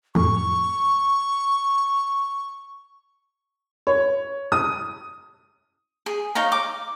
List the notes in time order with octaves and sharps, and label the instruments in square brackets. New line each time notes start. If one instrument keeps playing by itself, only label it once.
[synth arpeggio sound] F2 A2 [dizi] C#6
[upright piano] C#5
D#6
[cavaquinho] G#4
D#4 C#5 F5 A#5
D6